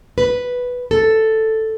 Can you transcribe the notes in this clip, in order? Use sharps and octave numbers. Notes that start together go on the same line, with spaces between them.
B4
A4